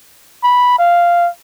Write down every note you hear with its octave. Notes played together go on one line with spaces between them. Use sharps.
B5
F5